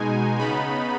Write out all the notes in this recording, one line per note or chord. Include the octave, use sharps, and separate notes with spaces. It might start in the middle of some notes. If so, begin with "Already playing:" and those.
Already playing: B2 G#3 D#4 G#5
C#3 B3 D#4 B5